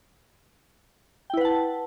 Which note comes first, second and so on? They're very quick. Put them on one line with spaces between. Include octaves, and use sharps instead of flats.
G5 E4 B4 F#5 A5